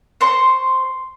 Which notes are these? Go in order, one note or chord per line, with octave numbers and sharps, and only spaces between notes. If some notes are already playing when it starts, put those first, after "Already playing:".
C5 C6 C#6